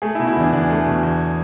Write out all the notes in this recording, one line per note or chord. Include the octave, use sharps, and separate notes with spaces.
A3 G#4
E4
B2
E4
E2 D4
E2 D4
A3
B2
E2